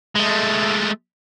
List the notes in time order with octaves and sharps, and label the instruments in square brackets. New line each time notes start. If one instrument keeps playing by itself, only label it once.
[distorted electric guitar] G#3 A3